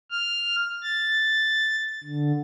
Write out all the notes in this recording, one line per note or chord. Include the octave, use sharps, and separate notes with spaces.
F6
A6
D3